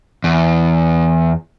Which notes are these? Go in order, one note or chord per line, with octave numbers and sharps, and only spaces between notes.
E2